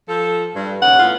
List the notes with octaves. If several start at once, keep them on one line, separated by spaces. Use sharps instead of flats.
F3 A4
G2
D#2 C#3 F#5
A2 B3 F4